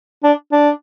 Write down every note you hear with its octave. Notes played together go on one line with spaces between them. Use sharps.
D4
D4